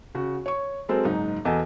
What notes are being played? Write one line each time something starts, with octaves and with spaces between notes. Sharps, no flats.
C#3 F#4
C#5 C#6
F#3 G#3 C4 A4 A#4 C5
F#1 G#2 D#4
E2 B2 A4 D#5 G#5